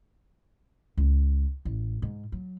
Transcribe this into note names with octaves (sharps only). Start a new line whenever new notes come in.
C#2
A1
G#2
F#3